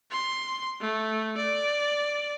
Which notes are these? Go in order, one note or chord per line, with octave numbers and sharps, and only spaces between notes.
C6
A3
D5